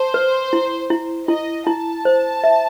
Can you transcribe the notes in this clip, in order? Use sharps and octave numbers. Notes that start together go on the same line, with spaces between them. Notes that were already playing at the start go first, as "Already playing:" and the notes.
Already playing: C5 A5
B4
E4
E4
E4 D#5
E4 A5
C5
E5